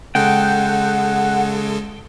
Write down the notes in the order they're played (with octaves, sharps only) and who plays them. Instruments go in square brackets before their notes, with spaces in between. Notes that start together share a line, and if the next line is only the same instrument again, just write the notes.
[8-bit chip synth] C#3 G#3 A4 [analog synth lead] F#5 [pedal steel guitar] G5